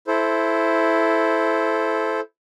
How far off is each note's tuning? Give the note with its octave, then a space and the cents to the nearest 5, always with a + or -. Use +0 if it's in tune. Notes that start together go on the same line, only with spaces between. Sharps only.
E4 +5 A4 -15 C5 +0